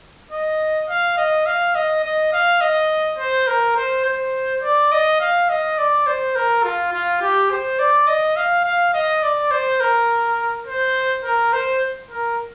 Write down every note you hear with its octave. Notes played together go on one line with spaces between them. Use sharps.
D#5
F5
D#5
F5
D#5
D#5
F5
D#5
C5
A#4
C5
C5
D5
D#5
F5
D#5
D5
C5
A#4
F4
F4
G4
C5
D5
D#5
F5
F5
D#5
D5
C5
A#4
C5
A#4
C5
A#4